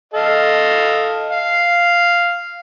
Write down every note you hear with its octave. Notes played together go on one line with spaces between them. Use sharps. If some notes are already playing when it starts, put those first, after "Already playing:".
A4 D#5 F5
F5